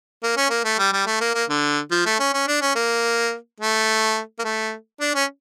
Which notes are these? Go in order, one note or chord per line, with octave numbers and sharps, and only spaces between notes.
A#3
C#4
A#3
A3
G3
G3
A3
A#3
A#3
D3
F3
A3
C#4
C#4
D4
C#4
A#3
A3
A#3
A3
D4
C#4